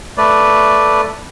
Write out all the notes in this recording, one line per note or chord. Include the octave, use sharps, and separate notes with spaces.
A3 B4 D5